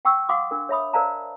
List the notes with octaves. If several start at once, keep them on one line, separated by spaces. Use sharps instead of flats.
F#5 G5 C#6 E6
F5 F#5 C6 D6 D#6
D4 A#4
C#5 E5 B5 D#6
A#4 C5 D5 F5 A5 A#5